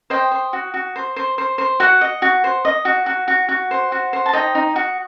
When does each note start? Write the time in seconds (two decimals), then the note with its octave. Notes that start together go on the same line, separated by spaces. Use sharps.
0.10 C5 D#5 G5
0.32 C5
0.53 F#4
0.74 F#4
0.96 C5
1.16 C5
1.38 C5
1.58 C5
1.80 F#4 F#5
2.01 D#5
2.22 F#4
2.44 C5
2.65 D#5
2.85 F#4
3.06 F#4
3.28 F#4
3.49 F#4
3.71 C5
3.92 F#4
4.13 C5
4.26 A5
4.33 D#4 D#5 G5
4.55 D#4
4.76 F#4